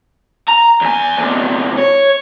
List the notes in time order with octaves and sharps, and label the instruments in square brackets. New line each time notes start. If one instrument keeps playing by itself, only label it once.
[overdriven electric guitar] A#5
E2 G#5
E2 C3
C#5